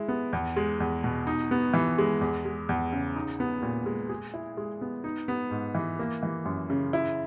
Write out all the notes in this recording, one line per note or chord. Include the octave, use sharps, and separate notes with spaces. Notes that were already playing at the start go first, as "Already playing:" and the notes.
Already playing: G#3 E4
B3
E2
G#3
E2
B2
D#4
B3
E3
G#3
E2
G#3
E2
C#3
D#4
B3
A#2
G#3
G#4
E4
G#3
B3
D#4
B3
G#2
E3
A#3
E3
F#2
C#3
E4